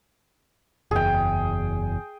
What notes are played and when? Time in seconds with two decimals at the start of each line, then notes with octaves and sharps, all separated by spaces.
0.91 F#1 E2 G#4 G5